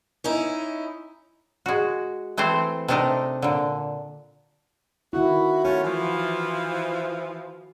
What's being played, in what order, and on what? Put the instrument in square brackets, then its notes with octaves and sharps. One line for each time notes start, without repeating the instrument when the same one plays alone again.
[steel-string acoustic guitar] C#4 D#4 E4
[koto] G#3 F#4
E3 A3 C4 C5
C3 A3 D4 D#4 A#4
A#2 D3
[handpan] D#3 E4 [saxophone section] F#4
[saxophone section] A3 C#4 F4 [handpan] F#4
[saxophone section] E3 F3